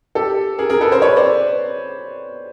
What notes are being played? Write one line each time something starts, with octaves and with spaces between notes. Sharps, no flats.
G4 A4
G#4 A#4
G#4 A#4
A4 B4
A#4 C5
B4 C#5
C5 D5